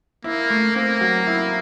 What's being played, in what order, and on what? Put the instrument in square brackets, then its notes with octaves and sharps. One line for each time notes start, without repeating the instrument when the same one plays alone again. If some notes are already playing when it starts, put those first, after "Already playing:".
[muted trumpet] A#3 [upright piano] E4
[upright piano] A3
[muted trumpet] A#3 [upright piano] C4
[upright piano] F#3
E4